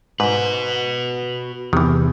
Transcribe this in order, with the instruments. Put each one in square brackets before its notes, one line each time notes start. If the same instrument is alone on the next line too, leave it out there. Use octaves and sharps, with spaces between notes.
[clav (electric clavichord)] G#2 [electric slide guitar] F#4 B4
[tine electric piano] E2 C3 [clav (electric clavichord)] D#3 E3